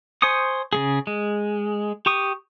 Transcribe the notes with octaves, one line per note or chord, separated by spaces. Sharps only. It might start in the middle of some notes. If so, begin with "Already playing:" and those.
C5 G#5 C#6 D#6
C#3 A3 G#4
G#3
G4 C#6 D#6